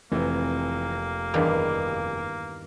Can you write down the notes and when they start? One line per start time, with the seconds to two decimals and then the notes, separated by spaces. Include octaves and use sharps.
0.12 F1 E3 A#3 C4
1.34 E2 G2 D#3 G#4 F5 D6